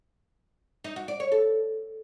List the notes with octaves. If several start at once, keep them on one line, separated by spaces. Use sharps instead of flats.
D#4
F#4
D5
C#5
A4